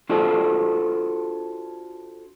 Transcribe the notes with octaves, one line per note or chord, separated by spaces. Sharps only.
D4 F4 F#4 A4 C5 C#5